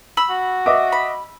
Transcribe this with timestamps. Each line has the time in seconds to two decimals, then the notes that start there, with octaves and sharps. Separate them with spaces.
0.17 B5 E6
0.29 F#4
0.66 D#5 E5 D6
0.92 B5